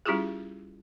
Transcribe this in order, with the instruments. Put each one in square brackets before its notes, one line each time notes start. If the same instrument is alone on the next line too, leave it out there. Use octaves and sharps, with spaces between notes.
[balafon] G3 C#4 E4 F4 G4 G#4